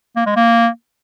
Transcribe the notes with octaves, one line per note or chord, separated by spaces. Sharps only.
A#3
G#3
A#3